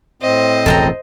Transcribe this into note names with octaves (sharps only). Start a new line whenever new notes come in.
A2 C4 C5 D#5
E1 A1 F2 A4 G5 A#5